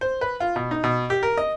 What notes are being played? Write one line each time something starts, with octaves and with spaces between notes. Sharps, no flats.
C5
B4
F4
B2
D#4
B2
G4
A#4
D#5